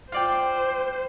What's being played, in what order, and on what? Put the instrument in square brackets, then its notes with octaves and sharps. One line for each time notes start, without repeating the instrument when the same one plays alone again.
[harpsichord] F4 D5 G5 [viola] C5